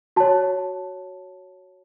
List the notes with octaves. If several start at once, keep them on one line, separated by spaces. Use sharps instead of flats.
F#4 C#5 A5